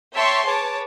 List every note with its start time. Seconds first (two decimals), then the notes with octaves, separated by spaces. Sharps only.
0.14 C#5 E5 G5 A5 C6 C#6
0.45 G#4 B4 C#5 A5 D6